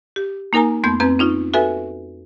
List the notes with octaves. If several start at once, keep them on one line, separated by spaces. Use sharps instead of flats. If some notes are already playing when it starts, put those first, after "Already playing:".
G4
A#3 D#4 A#4 G#5 A#5
F2 A3 B3 C6 G6
F2 C4 B4 A#5 G6
C#4 D#4 F4
F#4 A4 B4 E5 G#5